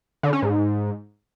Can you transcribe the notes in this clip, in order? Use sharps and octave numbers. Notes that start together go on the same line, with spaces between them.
D3
C#4
G#2